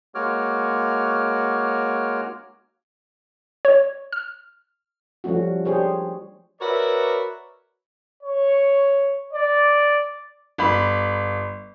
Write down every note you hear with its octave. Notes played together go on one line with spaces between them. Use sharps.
G#3 A#3 F#4 C#5 D6 F6
C#5
F6
F3 G3 A3 C#4 F#4
D4 G4 G#4 C5 C#5
F#4 A#4 B4 C#5 D5 E5
C#5
D5
G1 B5